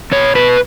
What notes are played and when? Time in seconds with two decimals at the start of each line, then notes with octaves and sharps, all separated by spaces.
0.12 B2 C#5
0.35 B2 B4